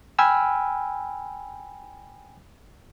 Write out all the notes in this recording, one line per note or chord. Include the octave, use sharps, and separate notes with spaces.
G5 G#5 B5 E6 F6